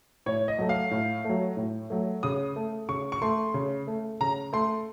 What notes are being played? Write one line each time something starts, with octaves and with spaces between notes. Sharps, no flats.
A2 C#5
D#5
F#3 A3
F5
A2
F#3 A3
A2
F#3 A3
C#3 D#6
A3
C#3 C#6
C#6
A3 C6
C#3
A3
C#3 A#5
A3 C6